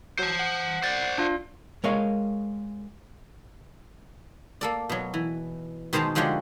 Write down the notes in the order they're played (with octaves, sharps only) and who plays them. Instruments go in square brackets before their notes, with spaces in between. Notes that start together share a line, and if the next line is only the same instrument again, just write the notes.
[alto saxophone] F#3 [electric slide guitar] C5 A5
[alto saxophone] F#5
[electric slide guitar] C5 D5 [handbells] A6
[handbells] D4 F4 F5
[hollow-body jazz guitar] G#3 A#4 C#5 D#5 F5
[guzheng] A#3 A4 D5
B2 F#3
E3
B2 D#3 G#3 C5 A5 A#5
D3 F3 G#3 F#4 G4 C#5